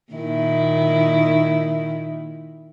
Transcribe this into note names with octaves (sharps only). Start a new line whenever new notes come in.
A#2 D#3 E4